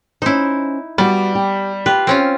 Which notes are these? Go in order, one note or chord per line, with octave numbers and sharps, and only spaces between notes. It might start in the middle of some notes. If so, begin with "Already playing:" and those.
C#4 D#4 E4 C5
G3 B3 F#4 D5
G4
F4 G4 B4
C4 C#4 F4